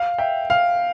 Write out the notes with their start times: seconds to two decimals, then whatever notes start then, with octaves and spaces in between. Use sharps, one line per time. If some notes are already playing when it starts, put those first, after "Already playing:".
Already playing: F5
0.18 E5 G5
0.50 F5